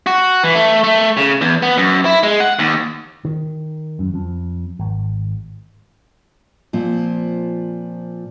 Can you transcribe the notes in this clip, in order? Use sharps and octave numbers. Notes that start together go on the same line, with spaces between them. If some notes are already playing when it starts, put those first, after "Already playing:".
F#4
E3
A3
A3
C#3
E2
B3
F#2
E4
G#3
F#5
D#2
D#3
F#2
F2
G#1
A#2 F3 C4